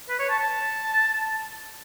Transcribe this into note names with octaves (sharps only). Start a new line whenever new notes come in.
B4
C#5
A5
A5